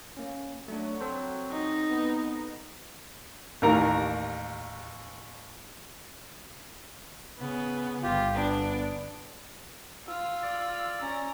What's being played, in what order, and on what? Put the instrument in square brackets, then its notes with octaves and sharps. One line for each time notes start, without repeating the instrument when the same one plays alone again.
[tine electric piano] A#3 C#4
[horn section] F#3 [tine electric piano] A3 D4
[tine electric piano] C4 A4 C5
[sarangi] D#4
[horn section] B3
[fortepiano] A1 D#2 A#4 A#5
[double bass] C#3 [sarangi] B3
[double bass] G1 [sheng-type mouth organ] F4 G4
[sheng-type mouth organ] B3 [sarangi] D4
[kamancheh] F4 [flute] E6
[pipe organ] D5
[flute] C#4 [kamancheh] A#5